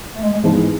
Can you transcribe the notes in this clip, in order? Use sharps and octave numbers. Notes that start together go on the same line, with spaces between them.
A3
G#3
G#3
G#2 E3 F3 G#3 B3